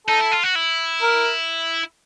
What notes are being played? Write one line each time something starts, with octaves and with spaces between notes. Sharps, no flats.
D#4 A4
E4
F4
F#4
E4
A#4